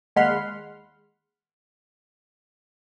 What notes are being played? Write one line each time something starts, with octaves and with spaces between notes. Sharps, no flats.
D#2 G#3 F#5 B5 C6 F6